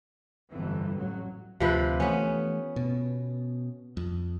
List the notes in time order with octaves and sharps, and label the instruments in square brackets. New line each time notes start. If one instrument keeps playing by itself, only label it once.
[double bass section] G1 F2 E3
A1 F#3
[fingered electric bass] D2 [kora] C3 F3 B4
[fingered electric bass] E3 A3 [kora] B3 C#4
[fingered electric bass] B2
F2